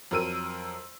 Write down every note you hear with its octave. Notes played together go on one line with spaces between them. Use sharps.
F2 F#3 A#4 E6 D#7